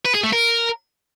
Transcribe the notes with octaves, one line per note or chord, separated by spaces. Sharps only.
B4
G#4
A3
A#4